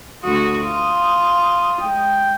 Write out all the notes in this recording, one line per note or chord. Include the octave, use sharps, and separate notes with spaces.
D2 F#4 D#6
F4
G#3 G5